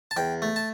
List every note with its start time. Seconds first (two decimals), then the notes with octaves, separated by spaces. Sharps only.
0.11 A5
0.17 E2 G5
0.42 A3
0.56 A5